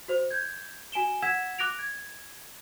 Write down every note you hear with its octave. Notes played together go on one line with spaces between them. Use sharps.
F#4 C5
G6 G#6
F#4 G#5 D7 E7 G7
F#5 E6 G#6 B6 E7
D6 F#6 A#6 D7 F7
G#6